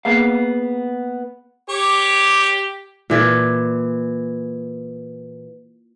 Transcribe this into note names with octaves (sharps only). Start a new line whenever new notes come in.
A#3 B3 G#4 F5
G4 C#5 D6
A#2 E3 D5